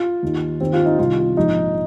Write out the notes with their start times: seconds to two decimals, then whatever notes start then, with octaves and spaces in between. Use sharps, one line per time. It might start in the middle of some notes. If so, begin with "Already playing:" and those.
Already playing: F4
0.23 D#2 D#3
0.61 D#2 D#3 C4
0.73 F4
0.86 D#4
0.98 C2 C3 D#3 F4
1.18 F4
1.36 A#1 G#2 F3 D#4